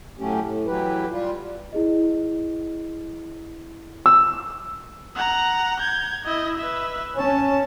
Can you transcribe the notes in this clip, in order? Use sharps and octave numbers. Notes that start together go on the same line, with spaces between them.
A2 F#3 A3 C#4 G4
A2
E3 F#3 G4 B4
G3 F4
E4 G#4 D#5
E6
F#5 A#5
G6 G#6
E4 D#5
B4 E5
C#4 A5